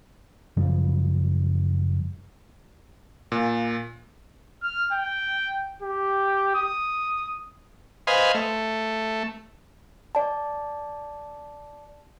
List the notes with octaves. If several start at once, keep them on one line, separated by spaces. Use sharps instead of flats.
F#2 C#3 F3 G3
A#2
F6
G5
G4
D#6
B4 C5 D#5 F5 G#5
A3
D5 A5